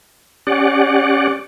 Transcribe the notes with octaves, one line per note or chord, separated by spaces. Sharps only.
C#4 G4 D5 F#5